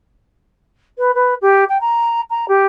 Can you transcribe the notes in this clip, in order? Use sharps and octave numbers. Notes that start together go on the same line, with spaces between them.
B4
B4
G4
G5
A#5
A#5
G4